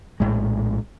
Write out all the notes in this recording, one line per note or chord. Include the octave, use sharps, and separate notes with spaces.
A#1 A2 G#3